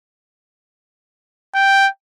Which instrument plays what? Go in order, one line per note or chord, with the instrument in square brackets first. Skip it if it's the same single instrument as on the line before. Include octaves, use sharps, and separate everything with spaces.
[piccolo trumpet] G5